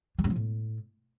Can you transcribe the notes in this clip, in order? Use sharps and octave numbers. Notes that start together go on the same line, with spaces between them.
F#3
G2
F3
A2